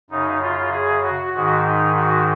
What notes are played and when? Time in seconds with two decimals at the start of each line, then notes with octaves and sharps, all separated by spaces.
0.10 F#2 C#3 D#4
0.42 F4
0.72 G#4
1.03 F#4
1.34 G#2 D#3 F#4
1.65 D#4
1.96 F#4